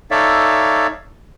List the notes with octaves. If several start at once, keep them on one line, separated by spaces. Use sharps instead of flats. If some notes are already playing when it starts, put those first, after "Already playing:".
D#4 A4 C#5 D5 E5 F5